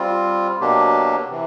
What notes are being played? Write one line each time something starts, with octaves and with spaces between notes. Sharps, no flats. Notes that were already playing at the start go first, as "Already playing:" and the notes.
Already playing: G3 C4 F4
B2 F#3 A#3 D4 G4
C3 E3